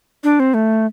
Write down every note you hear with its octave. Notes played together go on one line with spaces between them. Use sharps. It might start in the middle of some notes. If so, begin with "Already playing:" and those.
D4
C4
A3